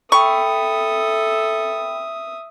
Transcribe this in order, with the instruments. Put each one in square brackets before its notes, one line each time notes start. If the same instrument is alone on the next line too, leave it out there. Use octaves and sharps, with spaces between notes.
[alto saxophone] A4 [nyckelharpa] E5 D#6 [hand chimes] G5 B5 [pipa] C#6